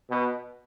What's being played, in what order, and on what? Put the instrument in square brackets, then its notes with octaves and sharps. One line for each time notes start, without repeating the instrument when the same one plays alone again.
[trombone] B2